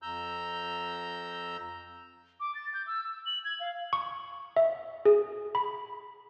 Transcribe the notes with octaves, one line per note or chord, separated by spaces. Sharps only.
F2 A#5 E6 G6
D6
A6
G6
E6
E6
F#7
G#6
F5
C#6
E5
G#4
B5